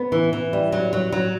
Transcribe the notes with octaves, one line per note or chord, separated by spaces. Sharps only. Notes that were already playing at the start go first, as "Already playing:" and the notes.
Already playing: B3
E3
E3
G3
F#3
F#3
F#3